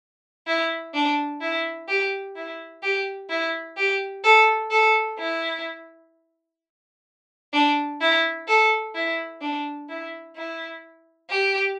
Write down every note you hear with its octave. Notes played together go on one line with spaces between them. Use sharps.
E4
D4
E4
G4
E4
G4
E4
G4
A4
A4
E4
D4
E4
A4
E4
D4
E4
E4
G4